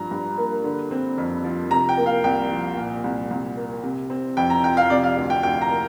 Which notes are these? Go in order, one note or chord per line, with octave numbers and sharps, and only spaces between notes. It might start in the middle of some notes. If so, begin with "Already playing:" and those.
Already playing: G2 F3 A#5
G2
A#3
D3
C4
F2
F3
C3 A#5
G5
A#3
F5
C2 G5
F3
A#2
C2
C2
A#3
C3
C4
F2 G5
A#5
F3 G5
F5
C3 D5
F5
D2
G5
D2 G5
A#5
A#3